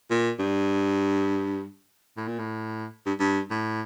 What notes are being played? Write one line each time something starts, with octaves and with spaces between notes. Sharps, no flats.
A#2
G2
A2
A#2
A2
G2
G2
A2